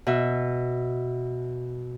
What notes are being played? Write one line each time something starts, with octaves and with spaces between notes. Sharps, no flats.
B2 E5